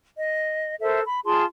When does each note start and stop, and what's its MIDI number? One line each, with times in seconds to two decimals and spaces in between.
0.18 0.74 75
0.81 1.01 69
0.81 1.01 70
0.81 1.01 72
0.81 1.01 76
1.04 1.19 83
1.25 1.44 65
1.25 1.44 68
1.25 1.44 81
1.25 1.44 84